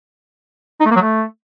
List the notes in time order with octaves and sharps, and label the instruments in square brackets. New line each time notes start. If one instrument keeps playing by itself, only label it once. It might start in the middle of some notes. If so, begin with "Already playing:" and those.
[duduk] D#4
A3
A#3
F#3
A3